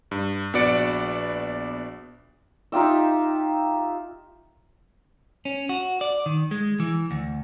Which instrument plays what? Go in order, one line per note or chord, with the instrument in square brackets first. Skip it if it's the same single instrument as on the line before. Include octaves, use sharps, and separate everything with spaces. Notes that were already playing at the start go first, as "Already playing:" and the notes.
[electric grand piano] G2
A#1 B3 F#4 D5 C#7 D7
[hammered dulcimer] D#4 F4 G4 E5
[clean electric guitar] C#4
F#4
D5
D#3
G#3
E3
D2